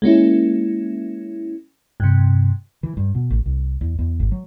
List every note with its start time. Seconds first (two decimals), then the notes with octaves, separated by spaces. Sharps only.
0.02 G#3 A#3 C#4 E4
2.00 G2 C3
2.83 E3
2.97 G2
3.15 B2
3.30 A1
3.46 C2
3.81 E2
3.99 E2
4.20 G#1
4.32 F#3